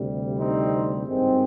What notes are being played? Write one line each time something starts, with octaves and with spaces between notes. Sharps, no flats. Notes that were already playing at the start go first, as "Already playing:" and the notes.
Already playing: D2 C3 G3
C4 D#4
G#1 G2 D#3 G#3 C4